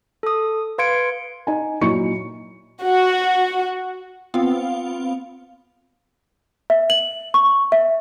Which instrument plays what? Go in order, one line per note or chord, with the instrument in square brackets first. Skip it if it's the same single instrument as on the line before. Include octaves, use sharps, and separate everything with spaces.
[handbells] A4 D#6
B4 F5 C6 G#6 C#7 D7
[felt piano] D#4 G#5
A#2 F#3 D#4 E4 C#6 C#7
[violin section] F#4
[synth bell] B3 C4 F4 F5
[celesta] E5
F#7
C#6
E5